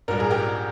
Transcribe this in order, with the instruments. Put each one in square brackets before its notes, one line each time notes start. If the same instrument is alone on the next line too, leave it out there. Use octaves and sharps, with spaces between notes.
[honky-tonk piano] A#1 G#2 G3 A#4
G#4
G4 A#4